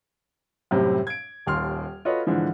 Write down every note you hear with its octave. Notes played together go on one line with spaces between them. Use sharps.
F#2 A2 C3 G3 C4
G#6 D7
D#1 D#2 C6 F6
F4 F#4 A4 B4 C#5 D#5
G#2 D3 E3 F3